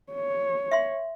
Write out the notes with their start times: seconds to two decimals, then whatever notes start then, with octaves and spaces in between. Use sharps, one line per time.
0.12 C#5
0.71 E5 F5 C6